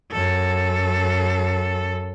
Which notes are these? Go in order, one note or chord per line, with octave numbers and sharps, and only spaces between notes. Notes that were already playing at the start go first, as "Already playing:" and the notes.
F#2 A4